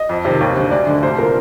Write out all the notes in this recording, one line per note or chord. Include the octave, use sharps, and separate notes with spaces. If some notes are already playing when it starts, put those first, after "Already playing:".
Already playing: D#5
F2
C3 D#3
D#2
D3
D2 D5
D3
C2 C5
A#2 A#4